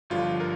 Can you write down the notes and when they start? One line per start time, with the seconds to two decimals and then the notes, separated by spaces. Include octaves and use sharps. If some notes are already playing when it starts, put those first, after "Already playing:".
0.10 G1 G2 D3 F3 F4
0.40 A#4